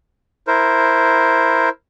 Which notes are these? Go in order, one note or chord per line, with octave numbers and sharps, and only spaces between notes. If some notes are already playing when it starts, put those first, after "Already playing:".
E4 A#4 C5